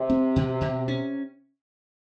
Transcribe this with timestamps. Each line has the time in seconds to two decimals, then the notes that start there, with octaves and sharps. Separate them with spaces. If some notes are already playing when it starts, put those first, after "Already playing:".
Already playing: C3
0.10 C4
0.36 B2
0.61 B2
0.88 C#4